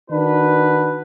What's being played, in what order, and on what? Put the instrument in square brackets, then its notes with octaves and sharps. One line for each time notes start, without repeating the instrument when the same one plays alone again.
[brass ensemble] D#3 D4 F#4 B4